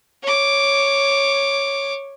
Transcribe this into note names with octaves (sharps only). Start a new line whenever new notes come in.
C#5 D6